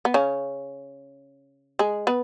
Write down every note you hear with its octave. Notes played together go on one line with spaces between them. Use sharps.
B3
C#3 C#4
G#3 G#4
B3 B4